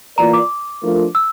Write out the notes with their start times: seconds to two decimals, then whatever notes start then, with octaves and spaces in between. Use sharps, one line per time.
0.17 E3 A#3 F4 A#4 D5 A#5
0.33 D6
0.83 F3 A3 D4 F4 A#4
1.15 E6